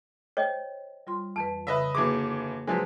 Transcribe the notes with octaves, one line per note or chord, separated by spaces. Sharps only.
C5 C#5 D#5 G5
G3 F4 C6
F2 E3 B4 A5
C#3 B4 D#5 E5
G1 E3 A#3 F#4 G#4 D6
F3 F#3 G#3 D4 B4 C5